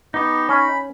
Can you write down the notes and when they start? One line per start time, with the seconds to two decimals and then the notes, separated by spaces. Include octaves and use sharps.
0.14 B3 D#4 G4
0.49 C#4 B5